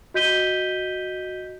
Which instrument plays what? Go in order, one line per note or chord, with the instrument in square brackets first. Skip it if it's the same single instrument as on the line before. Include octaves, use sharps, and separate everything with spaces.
[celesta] F#4 D#5 G6 B6 D#7 G7